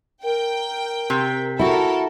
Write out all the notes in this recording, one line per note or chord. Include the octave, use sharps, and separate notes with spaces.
A#4 G5
C3
E4 F#4 A4 A#4